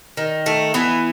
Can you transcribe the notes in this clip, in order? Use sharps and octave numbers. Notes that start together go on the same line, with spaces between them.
D#3
A3
E3 B3